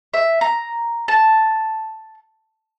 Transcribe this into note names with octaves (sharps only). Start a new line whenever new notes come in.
E5
A#5
A5